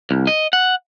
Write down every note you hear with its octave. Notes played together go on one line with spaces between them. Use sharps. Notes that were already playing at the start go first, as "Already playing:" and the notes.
C2
D#5
F#5